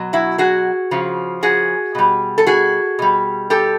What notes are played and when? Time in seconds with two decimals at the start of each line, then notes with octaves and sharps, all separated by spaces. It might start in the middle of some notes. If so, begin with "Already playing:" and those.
Already playing: B2 F#3
0.13 E4 F#4
0.38 F#4 G#4
0.91 C#3 F3
1.43 F#4 G#4
1.95 B2 G3
2.38 A4
2.47 F#4 G#4
2.99 B2 G3
3.50 G4 A4